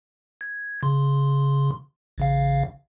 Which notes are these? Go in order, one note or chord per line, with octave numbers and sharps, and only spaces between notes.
G#6
C#3 C6
A1 C#3 F5